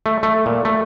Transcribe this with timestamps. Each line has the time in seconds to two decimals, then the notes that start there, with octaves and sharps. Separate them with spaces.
0.06 A3
0.23 A3
0.46 A#2
0.65 A3